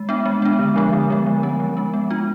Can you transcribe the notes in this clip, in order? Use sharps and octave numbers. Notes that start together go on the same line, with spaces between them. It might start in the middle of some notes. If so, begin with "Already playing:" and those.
Already playing: G#3
B3 D4
G#3
B3 D4
D3
F3 G#3 B3
D3
F3 G#3 B3
F3
G#3 C#4
F3
G#3 C#4
B3
D4 F4